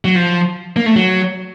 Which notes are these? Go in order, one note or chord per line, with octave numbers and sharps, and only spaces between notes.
F#3
F3
A#3
A3
F#3